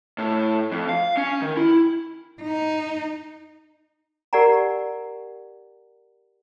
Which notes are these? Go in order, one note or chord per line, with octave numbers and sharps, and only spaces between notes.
A2
F2
F5
C#4
D#3
E4
D#4
G4 A#4 D5 F#5 G#5 A#5